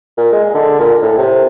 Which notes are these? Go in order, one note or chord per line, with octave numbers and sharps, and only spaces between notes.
A#2
G#3
D3
A#2
A2
C3